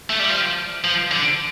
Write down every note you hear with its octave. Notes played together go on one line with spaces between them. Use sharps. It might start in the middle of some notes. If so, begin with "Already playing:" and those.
A3
G3
F3
F3
D3